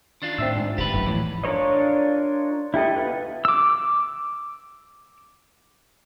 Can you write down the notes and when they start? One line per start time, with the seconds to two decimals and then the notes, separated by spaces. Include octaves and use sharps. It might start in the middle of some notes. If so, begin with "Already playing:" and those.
0.22 D#3 D4 F4
0.38 A2 C4 E5 E6
0.56 G#2
0.78 D1 G4 B4
0.93 G#1 F#2 A2
1.06 E2 A2 E3 F3
1.44 D4 F4 A#4 C#5 D#5
2.74 E4 G4 A4 D#5
2.97 B3 F4 B4
3.45 D6 E6